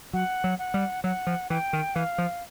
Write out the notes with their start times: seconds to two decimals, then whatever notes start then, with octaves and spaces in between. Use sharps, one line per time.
0.13 F#3 F#5
0.44 F#3
0.59 F#5
0.74 G3
1.04 F#3 F#5
1.27 F3
1.50 E3 G5
1.73 D#3
1.95 E3 F5
2.18 F3